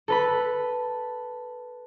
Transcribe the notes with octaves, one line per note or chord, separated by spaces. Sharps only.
A4 B4 B5